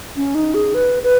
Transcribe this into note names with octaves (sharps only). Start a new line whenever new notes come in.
C#4
D#4
G#4
B4
B4